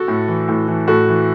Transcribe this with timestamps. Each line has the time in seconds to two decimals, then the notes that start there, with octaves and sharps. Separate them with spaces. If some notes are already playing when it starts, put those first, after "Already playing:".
Already playing: F#4 A4
0.08 A2
0.28 E3
0.49 A2
0.68 E3
0.88 A2 F#4 A4
1.08 E3